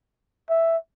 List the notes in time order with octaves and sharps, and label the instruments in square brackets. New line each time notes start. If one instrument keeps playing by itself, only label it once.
[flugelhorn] E5